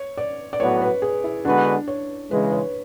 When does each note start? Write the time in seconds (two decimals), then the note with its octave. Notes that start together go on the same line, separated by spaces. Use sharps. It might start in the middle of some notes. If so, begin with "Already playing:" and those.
Already playing: C#5
0.17 D5
0.53 D5
0.59 A2 F#3 B3 F#4 C#5
0.82 B4
1.02 G#4
1.24 E4
1.45 D3 G#3 B3 D4 F#4 B4
1.88 C#5
2.30 C#3 E3 G#3 B4
2.52 C#5